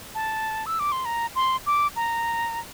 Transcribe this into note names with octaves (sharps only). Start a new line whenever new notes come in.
A5
E6
D6
C6
A#5
C6
D6
A#5